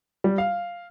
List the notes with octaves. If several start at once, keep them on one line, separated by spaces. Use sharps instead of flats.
G3
F5